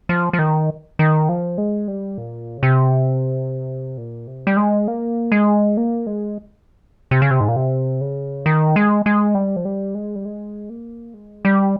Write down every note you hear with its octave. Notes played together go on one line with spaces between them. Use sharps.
F3
F3
D#3
D#3
F3
G#3
G3
A#2
C#3
C3
A#2
C3
G3
G#3
A#3
G#3
A#3
G#3
C3
C#3
C3
G#2
A#2
C3
C#3
D#3
G#3
G#3
G3
F3
G3
G#3
G3
G#3
A#3
G#3
G3